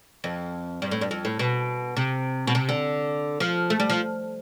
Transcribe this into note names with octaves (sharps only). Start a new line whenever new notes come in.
F2
G2
A2
G2
F2
A2
B2
C3
B2
C3
D3
F3
A3
G3
F3